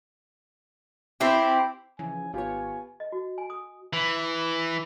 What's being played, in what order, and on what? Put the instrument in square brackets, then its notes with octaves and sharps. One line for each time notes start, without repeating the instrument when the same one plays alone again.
[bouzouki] C4 E4 G4
[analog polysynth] C#3 E3 F3 [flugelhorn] G#5
[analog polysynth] G#1 C#5 [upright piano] B3 F4 G4 [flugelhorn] G#5
[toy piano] D#5
F#4
G#5
D#6
[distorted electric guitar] E3